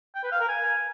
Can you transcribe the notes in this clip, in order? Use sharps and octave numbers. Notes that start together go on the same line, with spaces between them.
G5
B4
F5
A#4
G#5